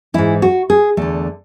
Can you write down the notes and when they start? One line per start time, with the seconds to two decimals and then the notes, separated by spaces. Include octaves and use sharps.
0.14 G#2 E3 E4
0.42 F#4
0.70 G#4
0.97 E2 D3 A3